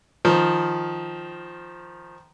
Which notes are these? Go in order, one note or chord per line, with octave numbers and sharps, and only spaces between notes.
D#3 F3